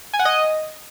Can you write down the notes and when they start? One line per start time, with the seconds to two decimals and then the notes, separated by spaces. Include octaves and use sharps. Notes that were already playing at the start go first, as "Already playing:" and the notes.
0.14 G#5
0.19 F#5
0.25 D#5